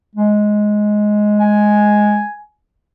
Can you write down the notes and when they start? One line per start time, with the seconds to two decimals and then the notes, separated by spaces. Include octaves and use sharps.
0.16 G#3
1.39 G#5